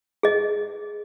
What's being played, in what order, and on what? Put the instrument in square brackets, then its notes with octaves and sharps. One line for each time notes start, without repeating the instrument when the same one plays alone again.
[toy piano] G#4 D#5